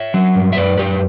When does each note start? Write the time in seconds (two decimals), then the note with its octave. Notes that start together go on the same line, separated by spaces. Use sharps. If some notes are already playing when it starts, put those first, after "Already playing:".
Already playing: C#5 E5
0.14 F#3
0.36 G2
0.53 E5
0.57 F#2 B4 D5
0.78 F#2 G4 B4